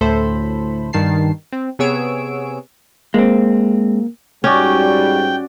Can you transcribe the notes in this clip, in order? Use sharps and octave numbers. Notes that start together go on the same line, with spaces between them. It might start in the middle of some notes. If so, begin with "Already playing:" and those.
D2 A2 A3 A4 C5 B5
G2 D#3 A5 C7
C4
C3 B3 G#4 C#5 E6 D7
G#3 A#3 C4 A#4
G#2 G3 C#4 F#4 D5 G5